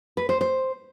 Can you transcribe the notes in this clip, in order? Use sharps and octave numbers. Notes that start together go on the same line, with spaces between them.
B4
C5
C5